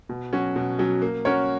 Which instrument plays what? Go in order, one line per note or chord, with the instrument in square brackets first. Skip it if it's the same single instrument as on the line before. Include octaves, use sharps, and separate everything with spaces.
[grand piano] B2
F#3 C#4 F#4
B2
F#3 C#4 F#4
A#3
C#4 F#4 A#4 C#5